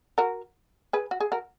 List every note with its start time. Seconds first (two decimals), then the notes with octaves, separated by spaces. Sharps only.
0.18 F#4 A#4
0.93 G#4 B4
1.11 F#4
1.20 G#4
1.32 F#4 A#4